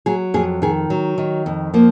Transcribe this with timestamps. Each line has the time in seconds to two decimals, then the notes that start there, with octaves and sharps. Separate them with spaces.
0.06 F#3 G#4
0.34 F2 G#4
0.62 D#3 G#4
0.90 F#3
1.18 D#3
1.46 F2
1.74 F3 A#3